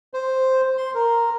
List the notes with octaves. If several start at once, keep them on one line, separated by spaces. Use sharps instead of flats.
C5
C6
A#4